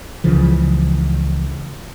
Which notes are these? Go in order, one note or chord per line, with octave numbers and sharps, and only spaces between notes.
C#2 C#3 E3 F3